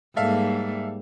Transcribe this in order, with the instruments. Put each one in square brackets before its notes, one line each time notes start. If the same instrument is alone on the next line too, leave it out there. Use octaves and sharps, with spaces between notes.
[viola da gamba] G#2 G3 A#3 [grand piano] A4 E5 F5